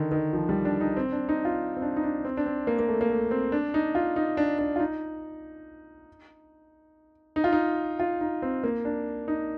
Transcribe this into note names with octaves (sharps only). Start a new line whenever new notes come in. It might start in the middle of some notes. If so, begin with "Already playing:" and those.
Already playing: D3 D#3
D#3
F3
G3
D4
D#4
C4
D4
D#4
F4
C4
D4
D#4
D4
C4
D4
C4
A#3
A#3
A3
A#3
A3
C4
D4
D#4
F4
D#4
D4
D4
F4
D#4
D#4
F4
D#4
F4
D#4
C4
A#3
D4
D#4